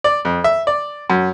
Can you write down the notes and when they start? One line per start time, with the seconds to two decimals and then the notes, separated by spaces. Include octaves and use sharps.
0.04 D5
0.25 F2
0.44 E5
0.67 D5
1.10 F#2